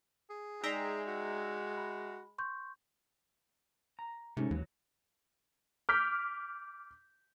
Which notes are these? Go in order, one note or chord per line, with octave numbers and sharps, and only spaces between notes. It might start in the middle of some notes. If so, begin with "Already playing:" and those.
G#4
G#3 D#4 D5 E5 G5 A#5 C7
F#4
B5
C6 C#6 G6
A#5
G#2 C3 A3 C#4 D#4
D#2 E3 F#3
D6 F6 G6 B6